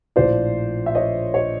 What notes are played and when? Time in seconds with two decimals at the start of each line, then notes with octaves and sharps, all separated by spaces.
0.16 A#1 A2 F3 C5 D5
0.86 E5
0.95 C#5 D#5
1.34 C#5 D#5